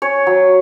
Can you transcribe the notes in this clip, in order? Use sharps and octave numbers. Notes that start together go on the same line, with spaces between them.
C#4 C#5
F#3